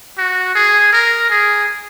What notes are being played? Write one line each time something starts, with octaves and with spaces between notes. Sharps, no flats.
F#4
G#4
A#4
G#4